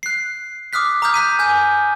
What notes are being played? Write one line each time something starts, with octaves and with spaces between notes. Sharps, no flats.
F#6 C7
D6 D#6 F6 F#6 B6
A#5 D6 D#6 F6 G6
F#6 B6 D#7
G#5 G6